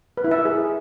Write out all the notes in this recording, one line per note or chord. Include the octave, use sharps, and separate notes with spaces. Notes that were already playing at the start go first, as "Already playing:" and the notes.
B4
E4
E5
A#4
G#4